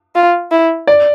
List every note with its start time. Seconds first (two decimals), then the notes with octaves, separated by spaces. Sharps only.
0.16 F4
0.52 E4
0.87 D5